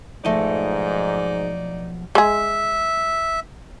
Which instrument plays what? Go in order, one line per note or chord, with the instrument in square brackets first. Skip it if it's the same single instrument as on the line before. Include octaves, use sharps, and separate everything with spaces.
[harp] B1 F3 [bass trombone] G#2 [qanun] A3 D#5 [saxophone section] D#4 D5
[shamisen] G#3 G#4 [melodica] E5